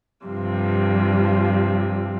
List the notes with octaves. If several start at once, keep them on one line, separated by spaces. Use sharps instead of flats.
G2 C3 F3